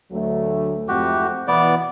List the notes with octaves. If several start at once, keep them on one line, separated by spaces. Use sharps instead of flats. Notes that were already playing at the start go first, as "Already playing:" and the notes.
D2 F#3 A3
F2 G#2 A3 F#4 G4
B2 E3 B3 D5